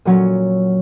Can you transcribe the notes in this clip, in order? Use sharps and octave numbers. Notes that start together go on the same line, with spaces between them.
A#2 F#3 C#4